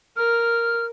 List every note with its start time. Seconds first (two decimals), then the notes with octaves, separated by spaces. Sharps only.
0.16 A#4 F6